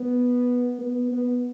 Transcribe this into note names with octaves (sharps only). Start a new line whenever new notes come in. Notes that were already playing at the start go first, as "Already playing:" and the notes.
Already playing: B3
B3
B3